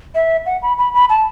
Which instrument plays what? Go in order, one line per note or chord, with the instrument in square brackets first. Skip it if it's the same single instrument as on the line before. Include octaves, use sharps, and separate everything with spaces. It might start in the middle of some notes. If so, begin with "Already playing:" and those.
[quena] E5
F#5
B5
B5
B5
A5